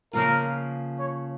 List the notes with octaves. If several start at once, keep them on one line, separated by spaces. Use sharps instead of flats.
C#3 F3 A#3 F4 A#4
C#5